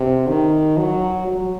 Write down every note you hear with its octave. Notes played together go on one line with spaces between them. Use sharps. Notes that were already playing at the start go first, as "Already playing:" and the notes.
Already playing: C3
D#3
F#3
F#3